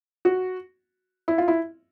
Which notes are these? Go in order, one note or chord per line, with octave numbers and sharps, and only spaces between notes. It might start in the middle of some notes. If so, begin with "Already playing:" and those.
F#4
E4
F4
E4